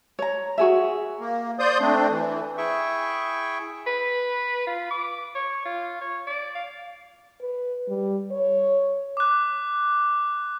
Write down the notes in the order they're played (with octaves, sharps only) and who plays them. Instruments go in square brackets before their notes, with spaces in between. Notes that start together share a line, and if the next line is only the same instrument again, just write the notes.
[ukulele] C#5 A#5
F#4 G#4 E5
[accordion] A#3
C5 D5 C6 D#6 G6
A3 C4 D4
E3
[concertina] E4 G#4 E5 G5 C#6
[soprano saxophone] B4
F4
D6
C#5
F4
C#5
D5
F5
[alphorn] B4
G3
C#5
[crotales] D6 F#6